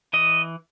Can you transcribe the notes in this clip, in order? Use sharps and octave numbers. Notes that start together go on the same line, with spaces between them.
E3 D#5